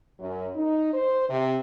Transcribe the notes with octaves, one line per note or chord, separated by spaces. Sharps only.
F#2
D#4
C5
C3